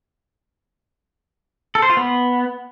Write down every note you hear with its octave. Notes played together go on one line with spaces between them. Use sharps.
A4
C5
F4
B3